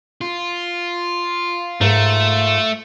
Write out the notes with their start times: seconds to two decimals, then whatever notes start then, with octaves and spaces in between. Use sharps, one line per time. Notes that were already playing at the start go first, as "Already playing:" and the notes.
0.21 F4
1.81 G#2 A3 A#4